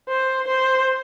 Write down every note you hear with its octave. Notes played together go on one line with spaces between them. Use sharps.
C5
C5